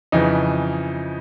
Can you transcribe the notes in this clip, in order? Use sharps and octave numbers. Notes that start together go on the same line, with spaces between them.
F2 C#3 E3 D#4